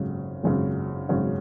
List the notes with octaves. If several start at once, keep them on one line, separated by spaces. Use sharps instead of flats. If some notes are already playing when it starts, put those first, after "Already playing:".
Already playing: G#1 F#2 C#3
G#1 F#2 C#3
G#1 F#2 C#3